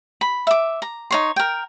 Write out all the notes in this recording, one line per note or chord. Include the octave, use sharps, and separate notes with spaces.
B5
E5 D6
A#5
D#4 C#5 C6
A#4 G5